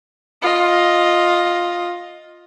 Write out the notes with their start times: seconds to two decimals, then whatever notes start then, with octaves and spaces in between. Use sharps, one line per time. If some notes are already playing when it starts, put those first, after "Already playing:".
0.42 F4 D#5